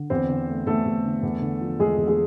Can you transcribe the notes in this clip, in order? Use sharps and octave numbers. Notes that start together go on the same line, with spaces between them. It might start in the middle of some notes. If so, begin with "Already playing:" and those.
Already playing: D3
E2 C4 C5
D3
A3
E2 A3 A4
E2
D3
E2
D3
F3
E2 G#3 G#4
E2
G#3 G#4